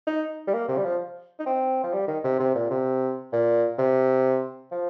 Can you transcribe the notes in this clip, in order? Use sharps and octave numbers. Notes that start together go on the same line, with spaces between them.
D#4
G3
A#3
C3
G3
F3
D#4
C4
F3
G3
D#3
C3
C3
A#2
C3
A#2
C3
F3